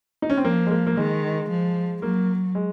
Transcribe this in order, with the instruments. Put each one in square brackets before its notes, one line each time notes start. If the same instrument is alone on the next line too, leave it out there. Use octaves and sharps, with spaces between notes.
[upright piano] D#4
C#4
C4
[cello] F3 [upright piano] A#3
[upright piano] G#3
A#3
A#3
[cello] D#3 [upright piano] G#3
[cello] F3
[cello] F#3 [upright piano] A#3
[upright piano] G#3